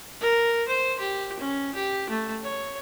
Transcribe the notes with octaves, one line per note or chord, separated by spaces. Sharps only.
A#4
C5
G4
C#4
G4
A3
C#5